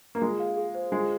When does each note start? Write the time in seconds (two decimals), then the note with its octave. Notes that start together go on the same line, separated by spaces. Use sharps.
0.15 A#3
0.22 G#3 F4
0.40 F5
0.57 G#4
0.75 C5
0.92 G#3 F4